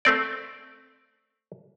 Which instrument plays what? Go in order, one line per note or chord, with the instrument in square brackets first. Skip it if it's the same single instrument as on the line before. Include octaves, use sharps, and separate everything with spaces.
[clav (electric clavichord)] A3 C4 D5